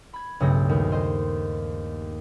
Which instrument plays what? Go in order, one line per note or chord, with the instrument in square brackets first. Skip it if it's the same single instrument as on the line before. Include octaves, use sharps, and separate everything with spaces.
[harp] B5 G#6
B1 G2 C#3 A3 G4 A#6
D#2
C5 D#5